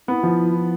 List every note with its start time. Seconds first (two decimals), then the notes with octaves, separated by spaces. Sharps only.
0.08 B3 E4
0.23 F3